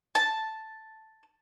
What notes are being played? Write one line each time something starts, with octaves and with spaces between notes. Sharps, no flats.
A5